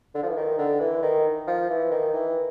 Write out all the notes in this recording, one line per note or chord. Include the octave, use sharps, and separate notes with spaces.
D3
F3
E3
D#3
D3
E3
D#3
F3
E3
D#3
E3